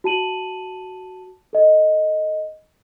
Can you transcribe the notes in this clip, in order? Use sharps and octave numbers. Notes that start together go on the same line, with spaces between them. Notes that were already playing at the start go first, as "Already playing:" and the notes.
F#4 A5 D#7 F#7
A4 D#5